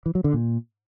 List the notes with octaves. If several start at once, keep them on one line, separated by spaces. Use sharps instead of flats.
E3
F#3
D3
A#2